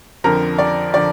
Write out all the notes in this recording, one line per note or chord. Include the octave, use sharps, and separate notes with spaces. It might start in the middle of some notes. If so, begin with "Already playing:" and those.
F2 D3 F3 A#4
D5
D3 F3 D5